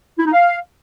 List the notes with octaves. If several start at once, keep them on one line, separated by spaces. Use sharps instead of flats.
E4
D#4
F5